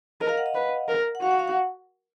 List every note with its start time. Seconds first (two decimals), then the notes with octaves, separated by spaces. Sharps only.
0.21 A#4 D#5
0.29 F5
0.37 F#5
0.46 D#5
0.55 B4
0.88 A#4
1.15 F#5
1.22 F#4 F5
1.31 F#5
1.39 F5
1.48 F#5